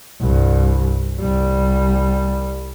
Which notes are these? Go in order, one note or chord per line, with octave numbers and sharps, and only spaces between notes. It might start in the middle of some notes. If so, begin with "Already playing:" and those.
C2 G2
C2 G3